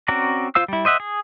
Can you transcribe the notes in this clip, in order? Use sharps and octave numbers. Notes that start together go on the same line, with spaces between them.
C4 C#4 F#4 D5 A#5
F4 C5 F5 E6
G3 E4
C5 D#5 E5 F#5
G#4